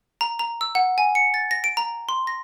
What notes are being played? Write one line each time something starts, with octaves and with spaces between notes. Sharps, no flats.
A#5
A#5
E6
F#5
G#5
C#7
A6
A#6
D7
A#5
C6
A#6